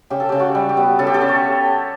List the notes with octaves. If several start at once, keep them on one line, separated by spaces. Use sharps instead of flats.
C#3 G4
A4
C#3 G4
F#4
G3
G4
B3
C#3 A4
G4
A4
C#3
C#5